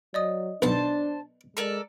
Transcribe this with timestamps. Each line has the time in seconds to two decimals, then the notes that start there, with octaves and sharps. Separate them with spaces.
0.14 F#3 D5 D#5 D#6
0.62 B1 D4 C5 A5
1.57 G#3 A4 A#4 D5